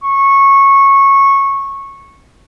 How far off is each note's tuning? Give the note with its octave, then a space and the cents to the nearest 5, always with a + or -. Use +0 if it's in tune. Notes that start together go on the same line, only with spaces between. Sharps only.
C#6 -15